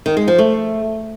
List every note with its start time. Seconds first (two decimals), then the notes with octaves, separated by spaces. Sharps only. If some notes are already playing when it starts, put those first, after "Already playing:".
0.06 D#3
0.17 G#3
0.28 F3
0.38 A3